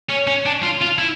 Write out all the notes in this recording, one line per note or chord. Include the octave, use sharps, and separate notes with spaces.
C#4
C#4
D4
F4
F4
E4